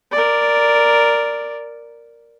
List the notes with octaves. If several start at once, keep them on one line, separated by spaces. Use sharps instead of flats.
A#4 D5